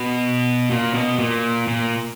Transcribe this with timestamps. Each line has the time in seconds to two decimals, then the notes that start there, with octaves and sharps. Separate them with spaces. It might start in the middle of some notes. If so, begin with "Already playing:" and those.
Already playing: B2
0.70 A#2
0.94 B2
1.19 A#2
1.67 A#2